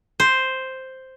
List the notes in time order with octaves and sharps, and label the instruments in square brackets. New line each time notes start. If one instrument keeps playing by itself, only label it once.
[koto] C5